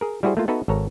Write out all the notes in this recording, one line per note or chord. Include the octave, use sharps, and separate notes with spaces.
G#4 A#4
G3 E4 F#4 G#4 C5
A3 A#3 F4
B3 D#4 F#4 A4 B4 E5
G#1 A4 C#5 A#5